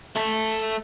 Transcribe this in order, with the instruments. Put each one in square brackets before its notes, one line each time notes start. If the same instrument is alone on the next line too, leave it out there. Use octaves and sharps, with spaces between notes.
[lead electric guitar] A3 A4